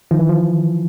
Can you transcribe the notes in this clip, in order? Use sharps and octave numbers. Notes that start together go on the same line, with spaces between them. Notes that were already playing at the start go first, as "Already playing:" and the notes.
D#3 F3
E3
F3